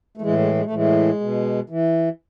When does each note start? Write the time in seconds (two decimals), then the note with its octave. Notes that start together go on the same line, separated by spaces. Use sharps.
0.17 A3
0.22 A2 E3 G#3
0.38 G#3
0.54 G#3
0.65 A3
0.71 A2 E3 G#3
1.21 B2
1.70 E3